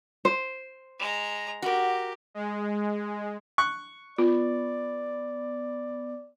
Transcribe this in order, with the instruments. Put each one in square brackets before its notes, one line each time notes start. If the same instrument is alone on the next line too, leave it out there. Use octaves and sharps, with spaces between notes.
[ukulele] C5
[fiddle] G#3 A#5
[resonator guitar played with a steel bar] F#4 A#4 [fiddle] G4
[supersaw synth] G#3
[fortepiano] C#6 F#6
[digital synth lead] B3 [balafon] F4 [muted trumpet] D5